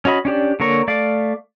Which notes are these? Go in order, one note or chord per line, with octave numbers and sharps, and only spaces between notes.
C#4 F#4 D#5 B5
C#4 D4 G4 D5
D3 A#3 C#5 A#5 C#6
A3 D5 F5 D6